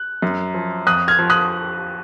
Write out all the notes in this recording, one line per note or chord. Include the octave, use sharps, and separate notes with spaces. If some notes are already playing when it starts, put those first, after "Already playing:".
Already playing: F#6
F#2
F3
F2 D#6 F#6
F6 G#6
F3
D#6 F#6